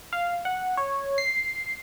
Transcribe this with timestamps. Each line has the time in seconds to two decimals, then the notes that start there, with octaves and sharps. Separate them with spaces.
0.13 F5
0.45 F#5
0.77 C#5
1.18 C7